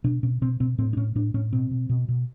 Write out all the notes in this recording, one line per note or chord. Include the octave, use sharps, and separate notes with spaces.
B2 D4
B2 C#4
B2 C4
B2 C4
A2 C4
D4
A2 C#4
A2 D4
A2 C#4
B2 C4
B2
B2
B2